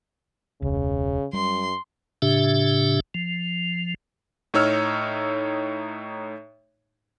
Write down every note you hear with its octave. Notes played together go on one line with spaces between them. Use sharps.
E1 C#2 C#3
F#2 G3 C6
A2 C#3 D4 G4 E5
F3
A2 D#4 C#5 E6 F6